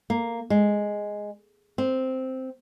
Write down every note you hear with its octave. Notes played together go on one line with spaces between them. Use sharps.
A#3
G#3
C4